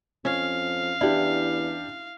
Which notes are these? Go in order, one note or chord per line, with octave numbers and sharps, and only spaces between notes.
F2 C#4 F5
E2 D4 E4 G4